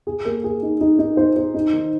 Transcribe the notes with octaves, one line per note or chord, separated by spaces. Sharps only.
G#4
A#3
G#4
D#4
D#4
D#4
C5
C5
D#4
D#3